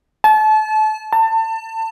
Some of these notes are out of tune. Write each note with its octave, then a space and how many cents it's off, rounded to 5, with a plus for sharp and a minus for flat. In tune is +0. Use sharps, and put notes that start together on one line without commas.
A5 -30
A5 +30